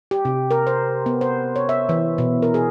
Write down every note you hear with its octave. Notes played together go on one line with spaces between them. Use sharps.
G4
C3
A#4
C5
B3
C5
C#5
E5
E3
B2
A#4
G#4